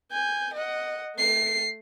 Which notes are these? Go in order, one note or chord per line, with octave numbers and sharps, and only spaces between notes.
G#5 G6
D#5 F#5
A3 C7